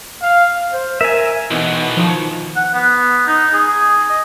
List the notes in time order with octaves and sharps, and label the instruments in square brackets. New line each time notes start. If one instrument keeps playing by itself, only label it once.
[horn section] F5
[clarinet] C5
[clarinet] A#4 [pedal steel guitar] E5 G#5
[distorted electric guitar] B1 B2 [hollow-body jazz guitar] E3 B3 D#4
[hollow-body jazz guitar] D#3 [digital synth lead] F3
[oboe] F#5
B3
D#4
G#4
D#5